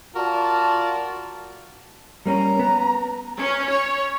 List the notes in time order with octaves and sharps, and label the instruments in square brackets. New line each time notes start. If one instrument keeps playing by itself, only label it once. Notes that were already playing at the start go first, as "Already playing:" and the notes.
[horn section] F4 F#4 A#4 D5 A5
[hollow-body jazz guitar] G3 A#3 C#4 [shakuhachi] A#5
[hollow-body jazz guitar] B3
[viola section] C#4
C#5